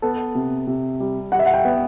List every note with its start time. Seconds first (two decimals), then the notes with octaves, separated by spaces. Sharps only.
0.02 B3 A4
0.35 C3
0.67 C3
1.00 G3
1.32 G3 F#5
1.39 E5
1.46 F#5
1.54 G5
1.65 B3